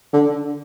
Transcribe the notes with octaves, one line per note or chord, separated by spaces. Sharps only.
D3